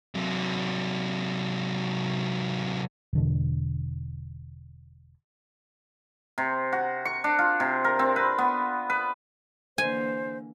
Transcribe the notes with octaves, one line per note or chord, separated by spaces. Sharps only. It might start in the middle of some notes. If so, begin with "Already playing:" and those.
C3 F#3
E1 D3 E3
C3
F#4
C#6
D4
F4
C3
A#4
C4
B4
B3
B4
D3 E3 A#3 C5 G#5